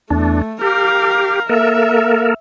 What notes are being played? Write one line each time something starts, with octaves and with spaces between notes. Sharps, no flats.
E2 A3 D4
G4 A#4 F5
A#3 A4 A#4 E5